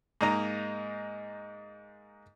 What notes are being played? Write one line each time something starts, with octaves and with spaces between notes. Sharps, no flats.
G#2 A#3 D#4 A#5